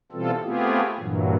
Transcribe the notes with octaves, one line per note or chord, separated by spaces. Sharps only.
B2 E3 G3 C4 F4 A4
A3 B3 C4 F4 G4 G#4
G2 A#2 E3 F#3